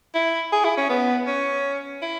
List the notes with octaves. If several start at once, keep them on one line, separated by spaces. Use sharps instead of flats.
E4
G#4
E4
C#4
B3
C#4
E4